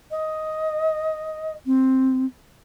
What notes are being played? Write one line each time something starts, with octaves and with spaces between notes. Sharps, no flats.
D#5
C4